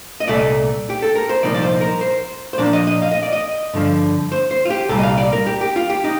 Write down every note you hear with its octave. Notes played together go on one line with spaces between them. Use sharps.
D#5
C2 A#2 A3 D5
G4
A4
A#4
C5
C2 A#2 F3 A#3 D#4 D5
D5
C5
A#4
C5
C5
A#2 F3 A#3 D4 D5
D#5
D#5
F5
D#5
D5
D#5
G2 D3 F3
C5
C5
F4
G4
C2 A#2 G3 A4
D#5
F5
D5
A#4
G4
G4
F4
G4
D#4